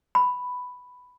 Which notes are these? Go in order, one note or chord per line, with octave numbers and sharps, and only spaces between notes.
B5